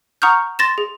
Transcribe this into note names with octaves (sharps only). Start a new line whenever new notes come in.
F#5 A#5 C#6 D#6 F6 G6
C6 A6 A#6 E7
G#4